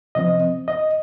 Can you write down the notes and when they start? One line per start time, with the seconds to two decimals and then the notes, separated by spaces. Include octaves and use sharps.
0.15 C3 F3 C4 D#5
0.68 D#5